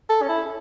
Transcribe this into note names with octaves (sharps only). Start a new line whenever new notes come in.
A4
C#4
E4